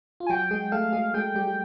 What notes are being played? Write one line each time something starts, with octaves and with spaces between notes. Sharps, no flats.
F4
G#5
F#3 F#4 G5
G#3 G#4
A3 A4 F5
G#3 G#4
G#3 G#4 G5
G3 G4
G4